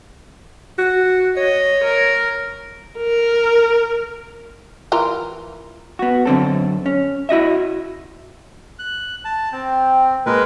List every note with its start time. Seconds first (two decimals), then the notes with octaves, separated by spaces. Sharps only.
0.79 F#4
1.37 C#5 D#5
1.84 A#4
2.98 A#4
4.92 E3 F4 A#4
5.99 B3 F#4
6.26 F#2 D3 C4 A4
6.86 C#4
7.29 E4 F#4 D#5 E5
8.79 F#6
9.25 A5
9.52 C4 G5
10.26 A#2 G#3 A#4 B4